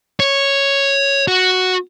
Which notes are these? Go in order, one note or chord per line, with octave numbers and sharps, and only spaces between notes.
C#5
F#4